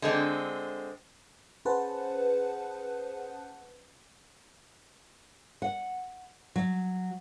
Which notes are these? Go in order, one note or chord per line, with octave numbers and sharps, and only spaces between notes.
D3 G#3 C4
C#4 G#4 B4 C5 F#5 A5
F#5
F#3